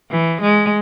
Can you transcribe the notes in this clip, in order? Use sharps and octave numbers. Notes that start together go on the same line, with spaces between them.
E3
G#3